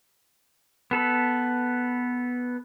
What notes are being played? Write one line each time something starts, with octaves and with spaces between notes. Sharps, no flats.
B3 A4 B4